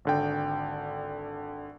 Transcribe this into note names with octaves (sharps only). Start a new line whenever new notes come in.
G#1 D3 G5